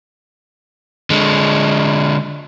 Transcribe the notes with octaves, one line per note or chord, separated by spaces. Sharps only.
D3 G#3